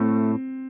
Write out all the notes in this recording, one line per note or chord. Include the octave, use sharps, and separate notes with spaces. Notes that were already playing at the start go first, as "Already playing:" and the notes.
Already playing: A2 A3 C4